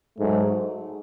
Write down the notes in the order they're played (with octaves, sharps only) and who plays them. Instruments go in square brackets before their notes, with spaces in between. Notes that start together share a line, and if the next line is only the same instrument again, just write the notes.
[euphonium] G#2 [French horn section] F#3 A3